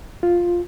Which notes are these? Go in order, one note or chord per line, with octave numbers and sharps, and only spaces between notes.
F4